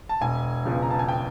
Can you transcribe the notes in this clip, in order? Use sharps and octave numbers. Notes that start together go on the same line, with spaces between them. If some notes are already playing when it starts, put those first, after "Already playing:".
A5
E1 G#5
E2 C#3 F3
A#5
A5
G#5
G5